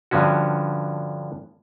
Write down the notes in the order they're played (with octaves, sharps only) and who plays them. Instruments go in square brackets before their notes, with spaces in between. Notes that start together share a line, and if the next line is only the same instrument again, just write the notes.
[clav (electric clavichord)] G2 D3 F3 C#4 F#4